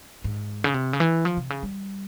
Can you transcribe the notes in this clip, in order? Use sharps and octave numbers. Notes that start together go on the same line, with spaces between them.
G#2
C#3
C3
C#3
E3
F3
C3
C#3
G3